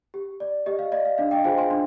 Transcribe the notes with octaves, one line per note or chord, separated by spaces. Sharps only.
G4
D5
G4 D#5
F5
D5 D#5
F5
D4 F5
D#5 G5
F4 G#4 C5 F5 G#5
G#5 C6
D4 C6